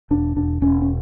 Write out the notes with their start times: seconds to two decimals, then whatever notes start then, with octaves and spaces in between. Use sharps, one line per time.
0.11 E1 D4
0.36 E1 D4
0.62 E1 C#4
0.82 C#4